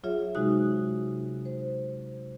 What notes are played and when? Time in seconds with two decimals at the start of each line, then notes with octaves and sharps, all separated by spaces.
0.04 F#3 F4 G#4 C#5 E5
0.35 C3 G#3 D#4 F#4 D#6 F#6
1.45 C5